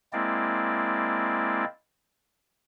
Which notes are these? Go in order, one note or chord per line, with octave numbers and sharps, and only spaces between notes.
G#3 A#3 C4 E4 D5